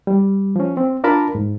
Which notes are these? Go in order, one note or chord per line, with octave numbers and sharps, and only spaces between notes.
G3
F3 C#4
C4
D4 F4 A#4 A5 B5
G#2